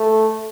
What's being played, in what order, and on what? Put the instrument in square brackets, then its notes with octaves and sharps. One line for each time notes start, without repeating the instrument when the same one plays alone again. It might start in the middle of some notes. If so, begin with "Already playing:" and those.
Already playing: [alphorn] A3